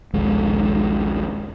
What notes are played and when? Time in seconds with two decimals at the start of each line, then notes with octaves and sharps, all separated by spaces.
0.13 A#1 D#2 G#3